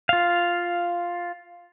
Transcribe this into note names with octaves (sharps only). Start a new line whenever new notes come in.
F4 F5